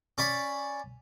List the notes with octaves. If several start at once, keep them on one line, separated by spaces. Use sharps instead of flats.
C#4 D5 B5